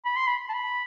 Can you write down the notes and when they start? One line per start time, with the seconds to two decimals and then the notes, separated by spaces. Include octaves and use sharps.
0.06 B5
0.17 C6
0.27 B5
0.50 A5
0.54 B5